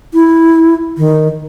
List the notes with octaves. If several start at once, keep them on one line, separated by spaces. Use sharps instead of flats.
E4
D#3